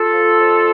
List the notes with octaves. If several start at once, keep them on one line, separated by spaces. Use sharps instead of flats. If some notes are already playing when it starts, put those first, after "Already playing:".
Already playing: F4 A4
F3
F2